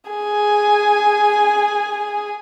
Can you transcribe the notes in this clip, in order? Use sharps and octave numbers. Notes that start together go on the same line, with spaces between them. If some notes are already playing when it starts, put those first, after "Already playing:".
G#4 G#5